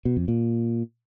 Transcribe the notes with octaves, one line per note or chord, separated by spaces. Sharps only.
B2
F2
A#2